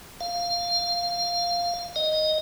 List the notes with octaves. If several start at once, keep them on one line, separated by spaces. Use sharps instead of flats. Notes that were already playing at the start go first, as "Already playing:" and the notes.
F5
D#5